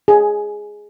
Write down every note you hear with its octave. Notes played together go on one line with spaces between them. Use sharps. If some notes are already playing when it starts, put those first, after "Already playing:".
G#4